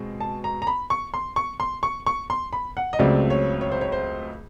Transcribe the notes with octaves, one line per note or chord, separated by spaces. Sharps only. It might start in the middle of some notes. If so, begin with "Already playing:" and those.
Already playing: B2 G#3 C4
A5
A#5
A#5
B5
C#6
C6
C#6
C6
C#6
C#6
C6
B5
F#5
D#5
C#2 C#3 F#3 A3 C4 D5
C#5
C#5
C5
C#5
C5